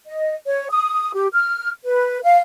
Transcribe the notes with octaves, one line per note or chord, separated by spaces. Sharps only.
D#5
C#5
D#6
G4
F6
B4
F5